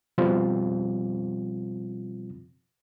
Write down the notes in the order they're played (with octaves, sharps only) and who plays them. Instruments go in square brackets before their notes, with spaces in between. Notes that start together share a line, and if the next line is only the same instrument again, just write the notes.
[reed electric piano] B2 F3 G3 C4 F4